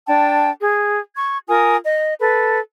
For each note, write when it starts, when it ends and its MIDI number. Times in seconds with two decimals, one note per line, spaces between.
0.08 0.50 62
0.08 0.50 79
0.08 0.50 81
0.62 0.99 68
1.16 1.39 85
1.16 1.39 92
1.48 1.76 65
1.48 1.76 70
1.48 1.76 80
1.48 1.76 87
1.84 2.14 75
2.19 2.60 69
2.19 2.60 71